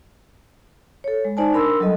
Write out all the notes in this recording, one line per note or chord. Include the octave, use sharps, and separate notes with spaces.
A4 C#5
G#3
D#4 C5 D5 G#5 A5
D4 A#4 B5 C6 E6
F#3 G3 A4 D#5